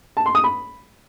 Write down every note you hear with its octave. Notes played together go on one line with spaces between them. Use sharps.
A5
C6
D#6
B5